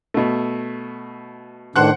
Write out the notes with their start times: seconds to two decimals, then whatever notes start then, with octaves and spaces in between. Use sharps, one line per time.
0.14 B2 A3
1.76 A2 D#3 D4 C5 F#5 F#6